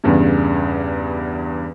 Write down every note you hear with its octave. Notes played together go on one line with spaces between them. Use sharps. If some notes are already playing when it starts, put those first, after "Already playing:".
E2 G2 C#3